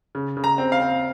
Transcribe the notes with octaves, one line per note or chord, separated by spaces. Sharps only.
C#3
C#3
A#5
C4
F5
C4